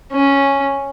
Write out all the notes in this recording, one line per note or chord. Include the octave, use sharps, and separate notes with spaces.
C#4